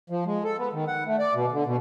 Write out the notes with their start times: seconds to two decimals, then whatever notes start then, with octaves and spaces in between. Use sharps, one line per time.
0.10 F3
0.26 G#3
0.44 A4
0.58 B3
0.73 D#3
0.87 F#5
1.06 A3
1.19 D5
1.34 B2
1.52 D3
1.66 B2